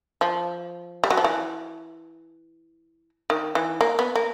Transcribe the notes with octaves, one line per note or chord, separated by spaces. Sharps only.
F3
G3
F#3
F3
E3
D#3
E3
A#3
B3
A#3